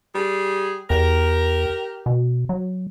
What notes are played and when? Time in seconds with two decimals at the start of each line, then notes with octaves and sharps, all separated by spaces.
0.14 G3 G#4
0.90 E2 G4 A#4
2.06 B2
2.49 F#3